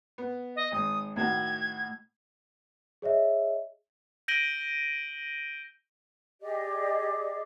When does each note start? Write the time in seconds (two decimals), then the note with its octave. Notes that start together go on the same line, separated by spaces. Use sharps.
0.18 B3
0.55 D#5
0.72 G#1 D#6
1.16 A2 D#3 F#4 G#6
3.02 G#4 C#5 D#5 E5
4.28 G6 A#6 D7 D#7 F#7 G7
6.41 G4 G#4 D5 D#5